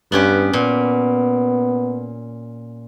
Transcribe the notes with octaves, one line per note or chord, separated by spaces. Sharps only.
G2 B3 C#4 G4
A#2 B3